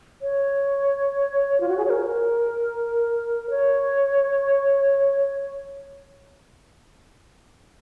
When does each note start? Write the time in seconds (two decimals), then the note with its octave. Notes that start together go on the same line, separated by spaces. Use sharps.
0.22 C#5
1.60 F4
1.68 F#4
1.77 G#4
1.85 C#5
1.90 A#4
3.50 C#5